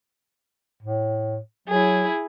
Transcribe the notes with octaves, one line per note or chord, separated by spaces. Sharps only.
A2
F#3 E4 G#4